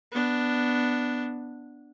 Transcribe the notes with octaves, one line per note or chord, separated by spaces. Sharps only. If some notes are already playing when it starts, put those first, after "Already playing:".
B3 D4